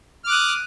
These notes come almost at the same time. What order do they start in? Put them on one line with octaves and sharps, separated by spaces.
F6 D6 F#6 D#6